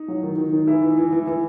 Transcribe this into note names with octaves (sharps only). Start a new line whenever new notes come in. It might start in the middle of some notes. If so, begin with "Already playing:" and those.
Already playing: D#4
F#3
D#3
D#3
D#3
E3 E4
E3
E3
E3
E3